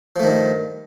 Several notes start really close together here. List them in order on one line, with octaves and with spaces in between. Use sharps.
F3 A3 D#3 G2